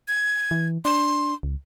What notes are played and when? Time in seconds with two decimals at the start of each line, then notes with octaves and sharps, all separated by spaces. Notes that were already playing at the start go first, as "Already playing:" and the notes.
0.08 G#6
0.51 E3
0.85 D4 C6
1.43 C#2